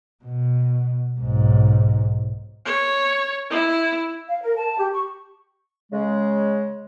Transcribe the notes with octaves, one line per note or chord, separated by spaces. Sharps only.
B2
B1 G#2
C#5
E4
F5
A#4
A5
G4
C#6
C#3 G#3